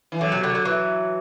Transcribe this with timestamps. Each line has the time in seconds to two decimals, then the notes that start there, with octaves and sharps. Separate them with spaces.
0.12 E3
0.21 D3 F#3
0.32 C3
0.43 D3
0.55 D3
0.65 E3